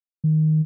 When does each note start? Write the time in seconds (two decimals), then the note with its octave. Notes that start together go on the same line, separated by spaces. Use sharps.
0.24 D#3